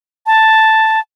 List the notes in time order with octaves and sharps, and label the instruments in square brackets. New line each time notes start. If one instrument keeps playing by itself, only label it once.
[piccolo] A5